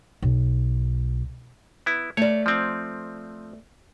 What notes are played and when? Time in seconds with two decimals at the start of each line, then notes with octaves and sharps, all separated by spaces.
0.22 B1
1.86 B3 E4
2.17 A3 C#5 D5
2.46 F3 C4